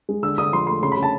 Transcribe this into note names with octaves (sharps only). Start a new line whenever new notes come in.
G#3
D3 E6
D3 D#6
F3 C6
A3 C6
C#3 C6
B5
C#3
A5